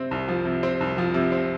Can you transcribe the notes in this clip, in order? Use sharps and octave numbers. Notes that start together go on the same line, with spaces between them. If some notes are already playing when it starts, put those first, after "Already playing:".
Already playing: C3 C4
C2
F3
C3
C4
C2
F3
C3
C4